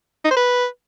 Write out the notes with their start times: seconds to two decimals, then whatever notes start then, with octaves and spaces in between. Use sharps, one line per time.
0.25 D#4
0.31 C5
0.36 B4